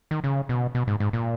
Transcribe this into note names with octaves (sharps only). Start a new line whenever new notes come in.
D#3
C#3
B2
B2
G#2
G#2
A#2